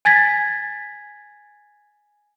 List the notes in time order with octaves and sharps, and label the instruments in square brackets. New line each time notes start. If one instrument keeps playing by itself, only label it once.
[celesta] G#5 G#6 A6 B6